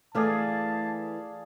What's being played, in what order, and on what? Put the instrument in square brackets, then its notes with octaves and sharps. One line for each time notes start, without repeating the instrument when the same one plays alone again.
[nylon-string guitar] E3 A3 [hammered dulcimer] G#4 D5 F5 [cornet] A5